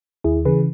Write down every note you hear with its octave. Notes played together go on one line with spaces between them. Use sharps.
D#2 E4 G#4
C#3 E3 G#4 B4